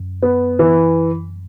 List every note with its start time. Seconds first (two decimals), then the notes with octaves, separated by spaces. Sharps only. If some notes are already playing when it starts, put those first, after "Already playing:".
Already playing: F#2
0.22 B3
0.59 E3